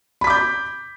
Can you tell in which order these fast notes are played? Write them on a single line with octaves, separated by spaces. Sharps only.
B5 B6 D6 G6